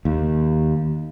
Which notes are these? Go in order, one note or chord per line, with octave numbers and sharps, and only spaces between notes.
D#2